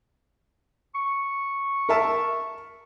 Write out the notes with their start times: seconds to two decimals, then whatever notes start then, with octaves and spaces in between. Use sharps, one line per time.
0.95 C#6
1.89 A#4 E5 A5